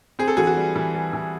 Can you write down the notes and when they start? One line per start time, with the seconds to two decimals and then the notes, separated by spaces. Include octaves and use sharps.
0.19 C4 G#4
0.28 A4
0.37 E3 F#4 G#4
0.47 F#4
0.57 G3
0.76 E3
0.95 G3
1.13 E3